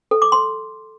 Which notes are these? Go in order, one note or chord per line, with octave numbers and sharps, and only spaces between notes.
A4
D6
C6